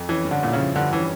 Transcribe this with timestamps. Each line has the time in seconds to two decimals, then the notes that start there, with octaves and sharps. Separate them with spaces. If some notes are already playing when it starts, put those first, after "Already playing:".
Already playing: F2
0.09 E3 C#4
0.25 G2
0.31 D3
0.43 A#2 E4
0.53 C#3 F3
0.76 G2 D3
0.93 E3 C#4